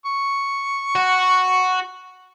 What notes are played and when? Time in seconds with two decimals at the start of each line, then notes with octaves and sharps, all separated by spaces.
0.06 C#6
0.96 F#4